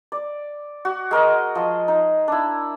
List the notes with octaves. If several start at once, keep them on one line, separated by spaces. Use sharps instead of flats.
D5
F#4
G#3 A#4 D#5
F3 D#5
D#4
D4 E4